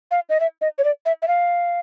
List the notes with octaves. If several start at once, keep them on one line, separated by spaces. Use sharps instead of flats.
F5
D#5
E5
D#5
C#5
D5
E5
E5
F5